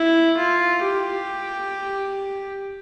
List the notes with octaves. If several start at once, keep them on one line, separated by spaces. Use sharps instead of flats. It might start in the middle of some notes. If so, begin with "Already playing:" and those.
Already playing: E4
F4
G4